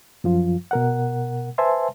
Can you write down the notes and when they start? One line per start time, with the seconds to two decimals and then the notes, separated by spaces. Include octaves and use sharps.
0.24 F#2 F3 F4
0.71 B2 A#4 F#5
1.58 B4 C5 E5 G#5 A5 C6